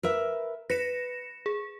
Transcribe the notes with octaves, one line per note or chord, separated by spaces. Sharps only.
A#4 B4 E5
B4 A#6 C#7 E7
G#4